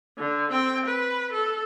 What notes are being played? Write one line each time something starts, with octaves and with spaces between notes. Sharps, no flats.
D3
C4 G5
B4
A4